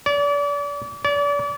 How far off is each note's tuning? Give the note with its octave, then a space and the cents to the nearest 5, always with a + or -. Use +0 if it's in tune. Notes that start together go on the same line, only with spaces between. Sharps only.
D5 -35
D5 -35